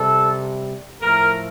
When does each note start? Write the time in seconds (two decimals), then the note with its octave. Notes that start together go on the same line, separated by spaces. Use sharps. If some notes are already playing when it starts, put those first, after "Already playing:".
Already playing: C3 G3 A4
1.01 A2 F3 A3 A#4